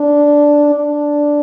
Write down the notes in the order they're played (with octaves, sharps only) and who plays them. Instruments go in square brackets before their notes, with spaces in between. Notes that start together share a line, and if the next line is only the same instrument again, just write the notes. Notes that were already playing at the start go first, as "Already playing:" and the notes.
Already playing: [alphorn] D4
D4